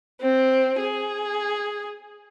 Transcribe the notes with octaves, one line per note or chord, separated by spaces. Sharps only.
C4
G#4